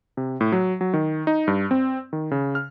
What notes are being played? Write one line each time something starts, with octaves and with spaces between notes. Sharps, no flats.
C3
A2
F#3
F#3
D#3
D#4
G2
C4
D#3
C#3
F6